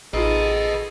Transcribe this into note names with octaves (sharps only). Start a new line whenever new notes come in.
A1 D#4 F4 G#4 A4 B4 D#5